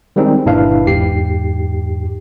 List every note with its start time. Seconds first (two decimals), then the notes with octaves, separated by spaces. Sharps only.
0.16 D#3 G3 G#3 C4 C#4 D#4
0.46 G1 A#2 D4 E4 B4 F5
0.86 E2 G#2 G4 C7